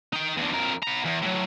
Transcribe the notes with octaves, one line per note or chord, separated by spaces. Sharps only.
D#4 G5
E2 D3
F2 A#4
B3 A#5
E2
A2 F#3